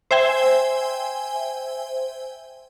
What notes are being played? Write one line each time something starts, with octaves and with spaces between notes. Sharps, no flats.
C5 E5 G5 G#5